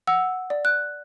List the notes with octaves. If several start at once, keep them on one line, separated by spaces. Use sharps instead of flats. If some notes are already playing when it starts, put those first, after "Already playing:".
F#5 E6
D5
F#6